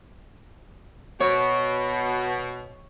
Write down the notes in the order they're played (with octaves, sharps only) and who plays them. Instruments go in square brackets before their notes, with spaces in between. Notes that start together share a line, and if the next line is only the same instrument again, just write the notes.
[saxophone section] B2 [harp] C#5